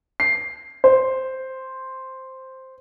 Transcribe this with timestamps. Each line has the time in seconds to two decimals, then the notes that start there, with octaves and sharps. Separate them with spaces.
0.20 C7
0.84 C5